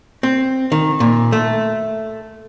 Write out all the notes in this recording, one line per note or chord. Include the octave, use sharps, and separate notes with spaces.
C4
D#3
A#2
A3